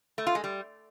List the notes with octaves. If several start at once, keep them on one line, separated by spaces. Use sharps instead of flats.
A3
F4
G#3
G3